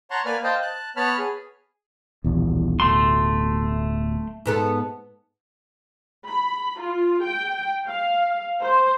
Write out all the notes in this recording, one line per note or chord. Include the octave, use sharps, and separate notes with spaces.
C#5 F#5 A5 A#5 C6 C#6
A#3 B4 D5 G#5 F6
C5 D#5 F5 G5 A5
A5 F#6
B3 C#5 A5 B5 F6
G#4
D#1 B1 E2
D1 B2 A3 C6
G#2 B3 A4
B5
F4
G5
F5
C5